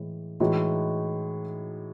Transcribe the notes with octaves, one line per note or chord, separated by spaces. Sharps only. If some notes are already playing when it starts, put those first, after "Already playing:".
Already playing: A2 E3 G#3
A2 E3 G#3 D#4 F#4